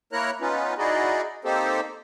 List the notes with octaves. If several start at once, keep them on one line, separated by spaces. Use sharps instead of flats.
A#3 E4 A#4 C#5 A#5 F#6
B3 C#4 D#4 F4 B4
D#4 E4 F#4 G#4 D5 D#5
A#3 C4 D#4 G4 A4 C5